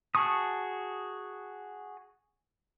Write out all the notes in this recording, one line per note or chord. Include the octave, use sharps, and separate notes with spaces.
F#4 G#4 A5 C#6 D#6